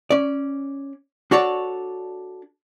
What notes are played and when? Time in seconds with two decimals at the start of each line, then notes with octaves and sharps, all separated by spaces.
0.11 C#4 D5
1.31 D4 F#4 A4 C#5 D5